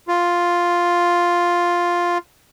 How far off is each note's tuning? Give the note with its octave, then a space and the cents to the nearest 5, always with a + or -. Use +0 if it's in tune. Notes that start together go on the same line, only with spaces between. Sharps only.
F4 +0